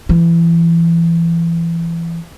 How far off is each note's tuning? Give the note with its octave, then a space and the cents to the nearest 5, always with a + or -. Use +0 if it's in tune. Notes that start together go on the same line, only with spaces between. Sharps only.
E3 +25